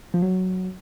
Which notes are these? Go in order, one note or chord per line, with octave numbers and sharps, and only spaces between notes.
F3
F#3